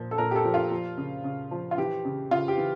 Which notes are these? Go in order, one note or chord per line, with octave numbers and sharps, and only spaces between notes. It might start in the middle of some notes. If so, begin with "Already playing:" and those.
Already playing: A#2 F3
A4
A#2 A#4
G4
A4
F3
F4
F3
C#3
C#3
F3
F4
E3 G4
C#3
C#3 F4
G4
E3